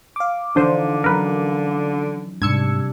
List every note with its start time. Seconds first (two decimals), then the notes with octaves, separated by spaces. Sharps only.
0.16 F5 D6
0.56 D3 E3 F3 D4 D#4 C5
1.04 F#3 C#4 A#4 B4
2.42 G#2 C3 G3 D4 E6 G#6 C#7